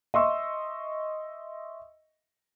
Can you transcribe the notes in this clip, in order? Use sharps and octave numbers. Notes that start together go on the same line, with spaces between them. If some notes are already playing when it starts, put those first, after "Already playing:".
D#5 E5 C6 C#6 E6